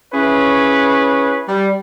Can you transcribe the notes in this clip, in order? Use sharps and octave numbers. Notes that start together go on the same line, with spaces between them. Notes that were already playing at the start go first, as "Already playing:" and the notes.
C#4 E4 G#4 B4 C#5
G3